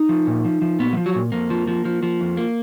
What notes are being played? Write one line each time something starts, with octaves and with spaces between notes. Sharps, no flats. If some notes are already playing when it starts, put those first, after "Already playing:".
Already playing: D#4
F3
A#2
F3
F3
A#2 B3
F#3
F3
F#3
A#2
F2 A#3
F3
F3
F3
F3
F2
A#3